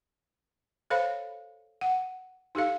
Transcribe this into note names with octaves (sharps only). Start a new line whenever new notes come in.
A4 C5 C#5 F5 B5
F#5
D#4 G4 A4 F5